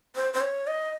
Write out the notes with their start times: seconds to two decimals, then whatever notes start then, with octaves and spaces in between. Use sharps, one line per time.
0.16 C5
0.34 C5
0.41 C#5
0.67 D#5